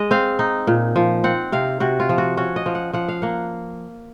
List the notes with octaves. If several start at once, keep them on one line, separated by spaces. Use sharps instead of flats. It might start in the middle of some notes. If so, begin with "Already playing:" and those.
Already playing: G#3 D#5
C4 F5
D#4
A#2
F3
C4 F#5
C3 F5
C3 F#4
F4
F3
F#4
C#4 F#4
D#5
F3
F#5
F3 F#5
F5
A#3 F#5